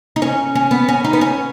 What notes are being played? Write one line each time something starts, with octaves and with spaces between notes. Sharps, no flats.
D#4
C#4
C#4
B3
C#4
D#4
B3
C#4